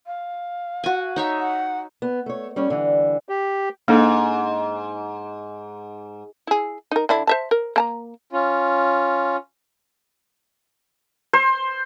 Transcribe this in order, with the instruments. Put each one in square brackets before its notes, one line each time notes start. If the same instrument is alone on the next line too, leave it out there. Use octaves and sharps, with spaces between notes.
[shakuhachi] F5
[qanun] F#4 G#5
D#4 C#5 E5
[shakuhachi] F#5
[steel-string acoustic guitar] B3
A3 C#5
G3 C#4 C#5
D3 E3 G3
[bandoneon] G4
[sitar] G#2 [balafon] A#3 D4 A4
[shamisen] E4 G#4
D#4 A#4
D3 D4 E4
C5 E5 A5
A#4
A#3 A5 A#5
[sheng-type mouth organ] C#4 F4
[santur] C5